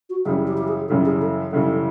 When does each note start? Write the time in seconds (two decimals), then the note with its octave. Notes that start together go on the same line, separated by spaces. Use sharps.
0.10 F#4
0.25 F#2 C#3 E3 G3 G#4
0.47 G4
0.57 G4
0.68 G#4
0.88 F#2 C#3 E3 G3 A4
1.05 G#4
1.21 A4
1.52 F#2 C#3 E3 G3 A4